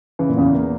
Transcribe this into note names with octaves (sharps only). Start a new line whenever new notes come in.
C#3 E3
A#2
E2 C#3
A#3